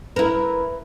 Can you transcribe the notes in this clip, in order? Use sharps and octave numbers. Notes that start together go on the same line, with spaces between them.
E4 A#4 B4